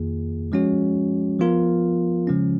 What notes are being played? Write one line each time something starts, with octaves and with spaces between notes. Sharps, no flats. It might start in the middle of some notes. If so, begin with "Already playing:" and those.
Already playing: F2 D#3 A#3 F4 G#4
F3 G#3 C#4 F#4 C#5
F3 B3 F4 A#4
C#3 F3 G#3 C#4